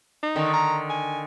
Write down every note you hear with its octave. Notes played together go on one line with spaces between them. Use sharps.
D#4
D3 D#3
A#5
G#5